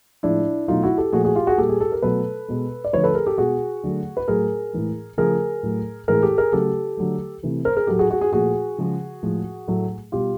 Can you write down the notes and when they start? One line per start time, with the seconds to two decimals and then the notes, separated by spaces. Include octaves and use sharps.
0.23 A2 F3 G#3 D4 E4
0.68 B2 F#3 A3 D#4 F4
0.83 E4 F#4
0.98 G4 A4
1.13 A#2 F3 A3 F#4 G#4
1.24 F#4 G#4
1.36 F4 G4
1.47 F#4 G#4
1.58 A#2 G3 G4 A4
1.69 G#4
1.80 A4
1.92 A#4
2.03 B2 F#3 A3 A4 B4
2.48 B2 G#3
2.85 D5
2.93 D3 F3 A3 B4 C#5
3.04 A4 B4
3.15 G#4 A#4
3.26 G4 A4
3.38 B2 G#3 F#4 G#4
3.83 D3 F#3 A3
4.17 B4
4.28 A2 F#3 A3 G#4 A#4
4.73 A2 E3 G#3
5.18 C#3 F3 A3 G#4 A#4
5.63 A2 F#3 A3
6.08 A2 E3 G#3 G#4 A#4
6.23 G4 A4
6.38 G#4 A#4
6.52 C#3 F#3 A3 G4 A4
6.97 D3 F#3 A3
7.43 C3 E3 A3
7.65 A#4 C5
7.77 G#4 A#4
7.87 A2 F#3 A3 G4 A4
7.99 F#4 G#4
8.10 F#4 G#4
8.21 F#4 G#4
8.32 A#2 F3 A3 F#4 G#4
8.78 C#3 F3 G#3
9.23 A2 F3 G#3
9.68 A2 F#3 A3
10.12 B2 G3 F4 G4